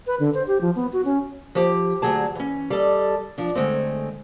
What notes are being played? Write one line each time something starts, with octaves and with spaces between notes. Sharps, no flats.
B4
D3
C5
G4
F3
B3
F#4
C#4
F3 G4
D2 G2 F#3 G#4 A5
E3 C#4
G3 A4 D#5
F3 D4
D3 G#3 A3 C4